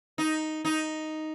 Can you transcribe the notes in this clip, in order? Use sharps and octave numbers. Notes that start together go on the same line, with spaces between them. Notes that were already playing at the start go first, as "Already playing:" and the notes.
D#4
D#4